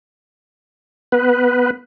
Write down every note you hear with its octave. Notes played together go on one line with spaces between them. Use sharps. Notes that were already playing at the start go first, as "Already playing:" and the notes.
B3 B4